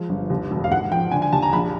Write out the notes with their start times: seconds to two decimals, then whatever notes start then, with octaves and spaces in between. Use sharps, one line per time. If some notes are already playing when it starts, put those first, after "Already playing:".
Already playing: F3 G#3
0.09 G1
0.30 D#2
0.51 E1
0.64 F5
0.71 G#2 F#5
0.91 F3 G5
1.11 D3 G#5
1.22 G#5
1.33 D#2 A5
1.42 A#5
1.53 A#1 B5